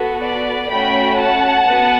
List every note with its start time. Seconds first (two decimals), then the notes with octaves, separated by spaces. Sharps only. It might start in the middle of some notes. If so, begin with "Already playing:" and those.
Already playing: B3 F#4 A4
0.21 B4 D5
0.70 A3 C#4 F#4 G5 B5
1.19 F#5 A5
1.69 B3 F#4